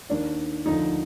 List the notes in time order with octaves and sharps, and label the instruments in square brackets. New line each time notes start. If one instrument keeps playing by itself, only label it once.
[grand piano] D#2 D#3 D4
D2 D3 F3 D#4